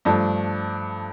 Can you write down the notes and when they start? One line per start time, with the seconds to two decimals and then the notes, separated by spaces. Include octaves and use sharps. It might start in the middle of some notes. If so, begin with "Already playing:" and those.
0.05 G2 F3 A3 D4